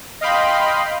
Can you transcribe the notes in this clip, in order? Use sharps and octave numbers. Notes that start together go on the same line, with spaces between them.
D#5 F5 G5 B5 C6